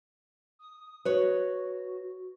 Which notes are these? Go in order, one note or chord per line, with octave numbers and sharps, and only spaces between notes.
D#6
F#4 B4 C#5